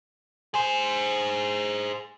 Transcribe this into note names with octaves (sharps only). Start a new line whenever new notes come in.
G#4 C5 G#5